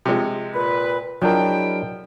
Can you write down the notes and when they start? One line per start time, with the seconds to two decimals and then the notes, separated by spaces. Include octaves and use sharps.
0.05 C3 F3 G#3
0.54 A#2 B4
1.22 F3 F#3 G#3 D4 E4 A#4 G5